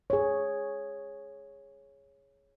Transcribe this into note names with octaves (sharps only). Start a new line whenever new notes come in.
G#4 C#5